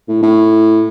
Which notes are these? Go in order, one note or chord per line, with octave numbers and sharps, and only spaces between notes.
A2
A2